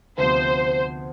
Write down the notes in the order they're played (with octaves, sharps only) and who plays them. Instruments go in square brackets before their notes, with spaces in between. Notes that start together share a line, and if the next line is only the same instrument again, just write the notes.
[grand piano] D2 C3 F3 B3 [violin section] C5